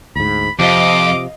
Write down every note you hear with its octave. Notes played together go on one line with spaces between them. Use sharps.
D2 G#2 B5
F2 C3 F3 D#5 F5 D6